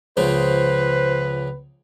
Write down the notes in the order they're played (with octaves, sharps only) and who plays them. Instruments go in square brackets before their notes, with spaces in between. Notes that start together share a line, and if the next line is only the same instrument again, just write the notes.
[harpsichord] C#2 C#3 F3 [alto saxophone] B4 [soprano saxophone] C5